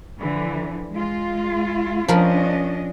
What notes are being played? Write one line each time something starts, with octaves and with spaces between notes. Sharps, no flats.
D3 E3 F3
G#3 F4
F3 C#4 D4 A#4 D#5 B5